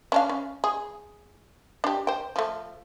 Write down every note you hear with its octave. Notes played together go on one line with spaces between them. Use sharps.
C#4 D4 F5
C#4
G#4
D4 G4
C5 G5
F3 A3